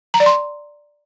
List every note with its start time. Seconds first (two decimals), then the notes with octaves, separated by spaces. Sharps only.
0.14 A#5
0.20 D5
0.26 C6